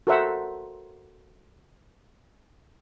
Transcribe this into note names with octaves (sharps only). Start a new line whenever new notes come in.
F#4 A4 A#4 C5 E5 F#5